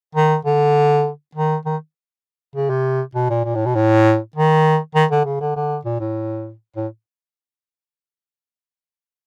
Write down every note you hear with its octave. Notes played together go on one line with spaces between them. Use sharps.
D#3
D3
D#3
D#3
C#3
C3
B2
A#2
A#2
A2
B2
A2
D#3
D#3
D3
C#3
D3
D3
A#2
A2
A2